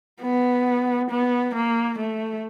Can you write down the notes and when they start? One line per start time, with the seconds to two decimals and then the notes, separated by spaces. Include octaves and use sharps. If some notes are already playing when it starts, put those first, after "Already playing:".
0.22 B3
1.10 B3
1.54 A#3
1.99 A3